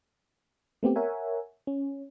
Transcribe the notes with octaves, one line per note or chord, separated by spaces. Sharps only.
A3 B3 C4 G4
A#4 C#5 E5 F#5 G#5
C#4